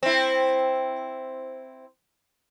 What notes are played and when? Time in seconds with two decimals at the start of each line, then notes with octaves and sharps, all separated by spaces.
0.03 C4 E4